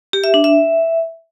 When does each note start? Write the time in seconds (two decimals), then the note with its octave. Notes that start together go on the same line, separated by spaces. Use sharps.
0.13 G4
0.24 E5
0.34 D4
0.44 E5